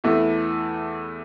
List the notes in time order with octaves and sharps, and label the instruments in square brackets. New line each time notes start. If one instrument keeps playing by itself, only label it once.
[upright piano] E2 E3 A3 E4 A4